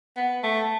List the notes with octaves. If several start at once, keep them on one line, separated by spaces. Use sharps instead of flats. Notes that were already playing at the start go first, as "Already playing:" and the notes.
B3
A3